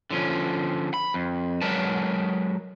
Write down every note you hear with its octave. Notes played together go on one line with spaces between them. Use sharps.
D3 F3 C#4
B5
F2
F#3 G#3 A#4 B4 D5 A5